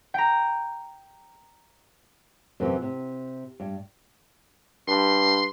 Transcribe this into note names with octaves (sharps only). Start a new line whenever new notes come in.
G5 A#5
F#2 C3 E3
C3
G2
G2 C6